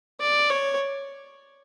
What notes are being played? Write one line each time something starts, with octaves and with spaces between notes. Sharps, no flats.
D5
C#5